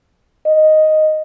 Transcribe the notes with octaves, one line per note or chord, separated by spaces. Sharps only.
D#5